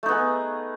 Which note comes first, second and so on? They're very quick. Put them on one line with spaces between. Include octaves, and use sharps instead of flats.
A3 D#4 B3 G#4